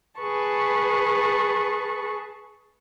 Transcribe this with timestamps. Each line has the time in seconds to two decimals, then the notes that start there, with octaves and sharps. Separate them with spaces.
0.20 G#4 B4 A5 C#6